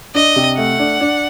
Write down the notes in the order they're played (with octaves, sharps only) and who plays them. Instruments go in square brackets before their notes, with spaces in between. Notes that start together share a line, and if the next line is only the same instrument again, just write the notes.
[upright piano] D4 [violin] D#5
[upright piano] C3
[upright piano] A3 [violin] F#5
[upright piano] D4
D4